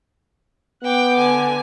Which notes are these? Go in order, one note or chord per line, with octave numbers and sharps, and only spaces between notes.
B3 F#5 G5 D6
D3 G#5